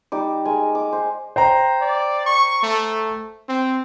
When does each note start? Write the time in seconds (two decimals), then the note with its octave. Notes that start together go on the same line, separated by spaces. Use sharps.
0.12 G3 D#4 D6
0.45 G#3 A#4 G#5
0.75 D6
0.93 C5
1.36 C5 G5 A#5
1.81 D5
2.26 C#6
2.63 A3
3.49 C4